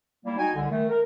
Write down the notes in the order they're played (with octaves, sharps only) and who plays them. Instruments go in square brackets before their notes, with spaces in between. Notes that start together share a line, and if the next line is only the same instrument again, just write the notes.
[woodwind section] G3 A#3 E4
D#4 F#4 G5 G#5
C2 D3
D#3 A3
A#4